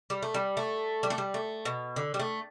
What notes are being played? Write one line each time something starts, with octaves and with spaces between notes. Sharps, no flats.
G3
A3
G3
A3
G3
A3
G3
A3
B2
D3
G3
A3